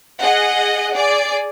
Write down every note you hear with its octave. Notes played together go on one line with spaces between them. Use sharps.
G#4 D#5 F#5
G#4 D5